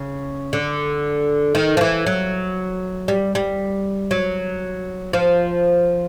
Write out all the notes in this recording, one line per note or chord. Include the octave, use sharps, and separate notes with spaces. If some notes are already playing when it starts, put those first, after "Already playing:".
Already playing: C#3
D3
D#3
F3
E3
F#3
G3
G3
F#3
F3